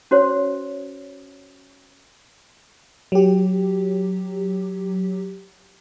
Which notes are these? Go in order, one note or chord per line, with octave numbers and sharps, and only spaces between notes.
C#4 F#4 C5 C#5
F#3 G4